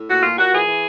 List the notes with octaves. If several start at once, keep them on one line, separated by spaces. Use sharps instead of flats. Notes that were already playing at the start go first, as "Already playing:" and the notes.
Already playing: A2
A#2 F#4
A#2 F4
A#2 F#4
E3 G#4
E3